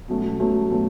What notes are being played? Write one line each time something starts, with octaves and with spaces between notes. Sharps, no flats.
B2 F#3 A3 C#4
B2 F#3 A3 C#4
B2 F#3 A3 C#4